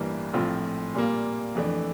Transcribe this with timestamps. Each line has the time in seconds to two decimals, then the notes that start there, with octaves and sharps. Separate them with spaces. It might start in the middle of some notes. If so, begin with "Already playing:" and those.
Already playing: A1 G2 E3 G3 A#3
0.33 A#1 A2 F3 C4 F4
0.95 A#2 G3 A#3
1.55 F2 E3 A3 D4